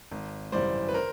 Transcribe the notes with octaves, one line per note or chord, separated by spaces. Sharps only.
G#1
F#2 C#3 E3 G3 C5 D5
B4
A#4 C5